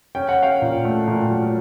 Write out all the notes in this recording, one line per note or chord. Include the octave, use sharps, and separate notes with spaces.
C#4 G5
F#5
C#4 F5 G5
A#2
A3
A#2
F#3